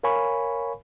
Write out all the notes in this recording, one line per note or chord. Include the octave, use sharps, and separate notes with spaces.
A#4 C#5 F5 G#5 B5 C#6